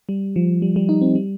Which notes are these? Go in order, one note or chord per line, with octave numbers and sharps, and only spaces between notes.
G3
F3
G3
G3
D#4
C4
G3